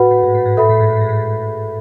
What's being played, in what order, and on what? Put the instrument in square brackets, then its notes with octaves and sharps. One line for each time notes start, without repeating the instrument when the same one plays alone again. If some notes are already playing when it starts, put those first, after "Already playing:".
Already playing: [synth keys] A2 [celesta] F#4 B4 F#5 B5
[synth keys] A2
G#2
A2
G#2
[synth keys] A2 [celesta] A4 E5 B5
[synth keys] A2
G#2
A2
G#2
A2